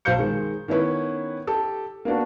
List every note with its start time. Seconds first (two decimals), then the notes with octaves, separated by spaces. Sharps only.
0.05 B1 C5 F5 G6 C#7
0.19 D#3 G#3
0.68 D#3 B3 C#4 E4 B4
1.47 G4 A4
2.05 A#3 B3 D4 F#4